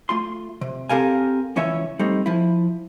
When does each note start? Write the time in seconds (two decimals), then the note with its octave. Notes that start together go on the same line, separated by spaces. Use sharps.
0.09 A3 F4 C6
0.61 C3
0.89 C4 G4 A4 A#4 F5 G#5
1.56 C#2 E3 C#4 C#5 E5
1.99 G3 A3 C4 D#4
2.26 F3 E4